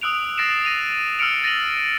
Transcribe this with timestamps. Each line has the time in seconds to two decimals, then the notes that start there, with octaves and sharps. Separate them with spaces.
0.01 D#6 E6 F#6 D7 F7
0.38 E6 A6 A#6 C7 D7 E7
0.65 A#6 D#7 F7
1.19 E6 F6 C#7 D7 F7
1.44 A6 A#6 D#7 F7 F#7